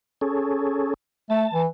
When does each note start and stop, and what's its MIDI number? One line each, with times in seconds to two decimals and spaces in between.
0.21 0.94 61
0.21 0.94 68
0.21 0.94 69
1.30 1.46 57
1.30 1.63 81
1.54 1.66 52